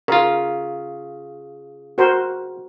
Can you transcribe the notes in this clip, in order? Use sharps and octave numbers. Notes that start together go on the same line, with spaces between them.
C#3 F4 A#4
F#4 A#4 C5